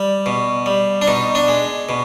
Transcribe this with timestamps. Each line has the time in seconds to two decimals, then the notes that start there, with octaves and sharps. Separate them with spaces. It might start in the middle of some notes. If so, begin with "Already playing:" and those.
Already playing: G3 D5
0.26 B2
0.66 G3
1.02 D4
1.08 B2 D#4
1.35 D4
1.48 G#3
1.89 B2